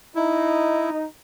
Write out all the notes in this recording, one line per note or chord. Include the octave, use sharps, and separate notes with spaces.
D#4 E4